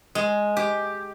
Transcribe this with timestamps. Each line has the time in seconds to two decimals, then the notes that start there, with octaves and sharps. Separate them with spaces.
0.15 G#3
0.57 G4